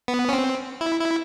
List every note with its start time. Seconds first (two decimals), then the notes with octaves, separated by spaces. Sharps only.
0.08 B3
0.29 C#4
0.33 C4
0.81 E4
1.00 E4